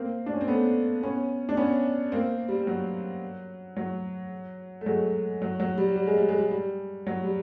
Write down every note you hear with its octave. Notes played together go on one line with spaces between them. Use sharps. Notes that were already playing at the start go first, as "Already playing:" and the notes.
Already playing: A#3 C4
D4
C#4
C4
A3 B3
B3 C#4
D4
B3 C#4
A#3 C4
G3
F#3
F#3
A3
F#3 G#3
F#3
F#3
G3
G3
G#3
G3
G#3
G3
G3
F#3
G3